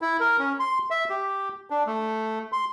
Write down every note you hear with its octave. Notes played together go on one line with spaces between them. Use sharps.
E4
A#4
C#4
C6
E5
G4
D4
A3
C6